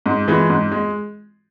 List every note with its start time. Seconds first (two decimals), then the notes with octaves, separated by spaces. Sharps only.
0.06 G#2
0.28 E3 G#3
0.50 G#2
0.72 G#3